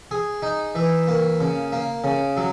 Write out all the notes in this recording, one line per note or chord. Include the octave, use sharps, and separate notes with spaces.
G#4
D#4
E3
A#3
C#3
A#3
C#3
F#3